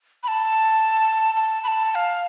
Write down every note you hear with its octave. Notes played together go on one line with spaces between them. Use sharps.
B5
A5
A5
B5
A5
A5
F5